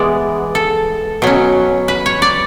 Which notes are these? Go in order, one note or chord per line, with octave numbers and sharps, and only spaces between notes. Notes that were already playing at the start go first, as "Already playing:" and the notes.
Already playing: E3 G#3 B3 D5
A4
B2 F#3 C#4
B4
C#5
D5